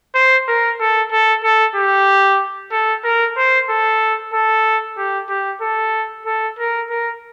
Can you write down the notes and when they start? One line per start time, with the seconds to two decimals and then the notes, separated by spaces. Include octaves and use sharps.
0.15 C5
0.48 A#4
0.80 A4
1.12 A4
1.44 A4
1.76 G4
2.72 A4
3.04 A#4
3.37 C5
3.70 A4
4.34 A4
4.97 G4
5.30 G4
5.62 A4
6.26 A4
6.59 A#4
6.90 A#4